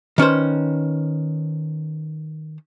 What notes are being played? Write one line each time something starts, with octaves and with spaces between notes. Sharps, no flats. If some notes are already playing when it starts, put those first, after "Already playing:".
D#3 C#4 B4 C5